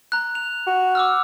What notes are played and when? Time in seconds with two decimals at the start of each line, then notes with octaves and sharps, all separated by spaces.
0.12 A#5 F#6
0.35 F7
0.67 F#4
0.95 D6 E6 F6